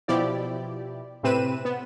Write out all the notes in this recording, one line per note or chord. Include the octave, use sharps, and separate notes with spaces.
B2 F3 E4 G4 D5
A2 C3 C4 B4 D#7 E7
B3